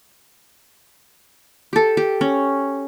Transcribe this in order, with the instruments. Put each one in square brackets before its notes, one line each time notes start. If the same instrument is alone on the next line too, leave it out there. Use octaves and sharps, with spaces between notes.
[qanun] G4 A4
G4
C#4